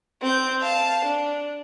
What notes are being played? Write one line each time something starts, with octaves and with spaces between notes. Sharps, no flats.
C4 G6
F5 A5
D4